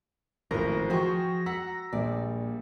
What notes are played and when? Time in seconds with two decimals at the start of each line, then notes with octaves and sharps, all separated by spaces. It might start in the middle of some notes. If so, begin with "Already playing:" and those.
0.51 G#1 A2 C#3 F3 A#3 A#4 A#6
0.90 F3 F#4 G#4 C5 G5 C#6
1.46 F#5 A#5 E6 B6
1.93 A#1 G3 A#3 D5